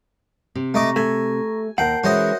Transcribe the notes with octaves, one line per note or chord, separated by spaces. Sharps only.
C3
A3 D#5 A#5 C#6 D6 A#6
A3 G#5
D#2 A#4 F#5 G5 A5 G6 C7
E3 G#3 C#4 F#4 C5 C#5 D#5 E5